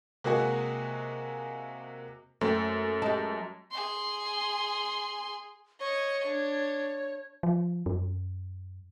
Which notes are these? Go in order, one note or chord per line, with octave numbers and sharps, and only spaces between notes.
C3 G#3 A#3 F#4 D#5 G#5
F#2 A3 C5 G5
G#3 G4 A5
G#4 C6
C#5 D#5 C#6
D4
F3
F#2